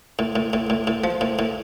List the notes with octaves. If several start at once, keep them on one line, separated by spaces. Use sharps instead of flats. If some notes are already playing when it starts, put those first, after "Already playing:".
A2
A2
A2
A2
A2
F3
A2
A2